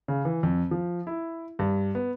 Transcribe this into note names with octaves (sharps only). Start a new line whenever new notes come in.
C#3
E3
F2
F3
E4
G2
B3